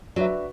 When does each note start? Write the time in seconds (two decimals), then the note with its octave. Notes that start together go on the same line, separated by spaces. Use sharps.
0.16 F#3 D4 F#4 B4 E5